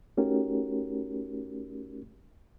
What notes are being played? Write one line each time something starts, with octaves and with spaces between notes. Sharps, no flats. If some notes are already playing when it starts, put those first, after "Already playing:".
A3 C#4 D#4 F#4 G4 A#4